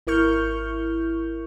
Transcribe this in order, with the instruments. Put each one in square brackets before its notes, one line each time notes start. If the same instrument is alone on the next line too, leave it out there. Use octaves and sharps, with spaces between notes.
[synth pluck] G#1 E4 A#4 C#6 F6 G6